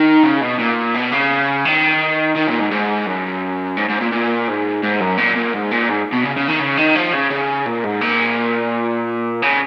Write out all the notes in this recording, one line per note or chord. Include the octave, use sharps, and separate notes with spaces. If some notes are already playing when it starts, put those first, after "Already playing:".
Already playing: D#3
C#3
B2
A#2
B2
C#3
D#3
D#3
A#2
G#2
G#2
F#2
G#2
G#2
A#2
A#2
G#2
G#2
F#2
A#2
A#2
G#2
A#2
G#2
B2
C#3
C#3
D#3
C#3
D#3
F3
C#3
C#3
A#2
G#2
A#2
C#3